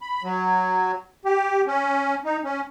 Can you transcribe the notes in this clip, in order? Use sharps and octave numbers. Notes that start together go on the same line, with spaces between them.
B5
F#3
G4
C#4
D#4
C#4